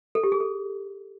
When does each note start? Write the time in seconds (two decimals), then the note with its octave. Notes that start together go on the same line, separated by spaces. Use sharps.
0.15 A4
0.24 G4
0.32 G#4
0.40 A4